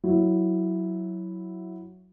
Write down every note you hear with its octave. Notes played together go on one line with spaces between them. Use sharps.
F#3 E4